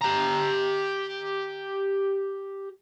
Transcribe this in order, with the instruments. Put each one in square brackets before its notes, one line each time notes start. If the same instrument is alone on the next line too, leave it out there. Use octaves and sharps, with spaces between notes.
[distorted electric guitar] G4 A#5